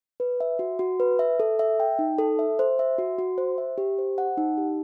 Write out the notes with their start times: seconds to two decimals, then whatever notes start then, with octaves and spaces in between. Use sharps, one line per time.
0.20 B4
0.40 E5
0.59 F#4
0.79 F#4
1.00 B4
1.19 E5
1.40 A4
1.59 E5
1.80 G5
1.99 D#4
2.18 A4
2.39 E5
2.59 C5
2.79 E5
2.98 F#4
3.18 F#4
3.38 C5
3.58 E5
3.78 G4
3.98 C5
4.18 F#5
4.37 D#4
4.57 G4